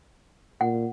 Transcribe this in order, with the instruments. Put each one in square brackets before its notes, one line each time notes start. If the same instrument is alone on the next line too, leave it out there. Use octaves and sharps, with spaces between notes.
[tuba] A#2 [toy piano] F#5